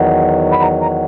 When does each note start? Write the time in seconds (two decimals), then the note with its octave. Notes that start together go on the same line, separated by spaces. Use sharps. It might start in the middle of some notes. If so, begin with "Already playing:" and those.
Already playing: E2 D#3 F#3
0.52 B5
0.62 A#5
0.82 A#5